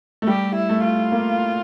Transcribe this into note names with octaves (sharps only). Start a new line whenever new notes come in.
A3
G3 G4
E4
A3
F4
A#3